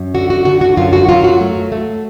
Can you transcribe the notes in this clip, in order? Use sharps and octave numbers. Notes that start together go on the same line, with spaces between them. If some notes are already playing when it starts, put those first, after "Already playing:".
Already playing: F#2
D3 F#4
F#4
D3 F#4
F#4
F#2 F4
F#4
F#3 F4
F#4
A3
A3